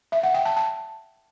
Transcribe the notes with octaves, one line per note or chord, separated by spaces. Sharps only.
E5
F#5
G5
A5
A5